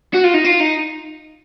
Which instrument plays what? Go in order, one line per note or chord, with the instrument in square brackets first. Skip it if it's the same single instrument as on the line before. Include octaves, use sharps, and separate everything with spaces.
[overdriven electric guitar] F#4
F4
D#4
F4
D#4